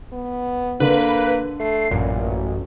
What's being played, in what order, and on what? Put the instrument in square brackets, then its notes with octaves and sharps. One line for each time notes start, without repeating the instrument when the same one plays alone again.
[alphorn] B3
[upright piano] D3 [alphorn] A#3 [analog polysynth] B4
[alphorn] A3 [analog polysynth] C7
[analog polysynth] A1 [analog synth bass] F#2 [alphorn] A#2